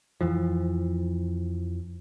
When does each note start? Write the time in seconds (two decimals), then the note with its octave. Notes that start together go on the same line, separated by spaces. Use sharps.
0.21 F2 E3 F3